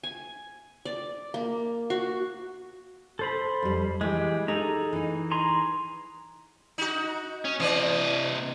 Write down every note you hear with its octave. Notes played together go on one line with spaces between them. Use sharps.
G#5
D5
A#3
F#4
A4 C5 B5
F2 G3
E3 G#3 G4
D#4 G#4 A4 A#5
E3 D#4
G#4 A#5 C6
D#4 F#4
C#4
C3 E3 D5 D#5